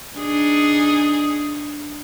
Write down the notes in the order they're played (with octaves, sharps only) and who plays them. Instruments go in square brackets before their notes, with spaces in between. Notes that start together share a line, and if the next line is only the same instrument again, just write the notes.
[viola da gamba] D4 D#4 G#4